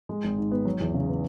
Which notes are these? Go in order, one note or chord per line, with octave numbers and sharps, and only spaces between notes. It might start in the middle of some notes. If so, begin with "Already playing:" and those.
G#3
G#1
G#2
B3
F#3
E2
C#3
B3